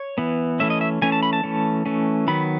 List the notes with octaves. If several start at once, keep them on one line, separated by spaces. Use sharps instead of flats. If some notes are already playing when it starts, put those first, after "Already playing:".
Already playing: C#5
E3 B3
E3 A3 C#4 E5
D#5
E5
E3 A3 C#4 G#5
A5
B5
A5
E3 A3 C#4
E3 A3 C#4
D#3 F#3 B3 B5